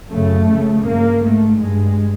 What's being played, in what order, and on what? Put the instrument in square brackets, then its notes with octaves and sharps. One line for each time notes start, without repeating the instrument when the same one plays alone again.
[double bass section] F#2 C#3 A3
F2 C#3
G2 A#3
G#2 A3
G2 G#3